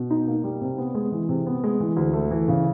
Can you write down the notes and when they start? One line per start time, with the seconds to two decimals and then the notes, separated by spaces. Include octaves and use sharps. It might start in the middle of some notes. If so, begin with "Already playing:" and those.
Already playing: B2
0.10 D#4
0.28 A#3
0.44 G3
0.61 C3
0.78 B3
0.95 G#3
1.12 E3
1.29 C3
1.46 B3
1.64 G#3
1.80 E3
1.96 D2
2.13 A3
2.31 E3
2.48 C#3